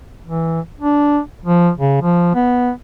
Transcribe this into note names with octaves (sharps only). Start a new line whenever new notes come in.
E3
D4
F3
C#3
F3
B3